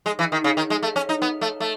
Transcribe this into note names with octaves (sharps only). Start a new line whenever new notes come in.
G#3
E3
D#3
C#3
D#3
G#3
A3
C#4
D#4
B3
A3
A3